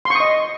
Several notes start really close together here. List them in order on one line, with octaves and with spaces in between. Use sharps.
C6 C#6 D#6 D#5